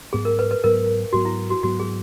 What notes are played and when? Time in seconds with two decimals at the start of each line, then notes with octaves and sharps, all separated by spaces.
0.13 G#2 F#3 B3 G#4
0.25 A#4
0.39 B4
0.51 B4
0.64 G#2 F#3 B3 A#4
1.13 G#2 F#3 B3 F#4
1.25 E4
1.50 F#4
1.63 G#2 F#3 B3 F#4
1.80 G#4